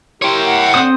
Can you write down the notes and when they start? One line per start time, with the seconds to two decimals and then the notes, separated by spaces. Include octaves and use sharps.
0.22 E4 G4 A#4 C#5 G5 C6
0.45 F#5
0.74 D3 C4 C5 D#6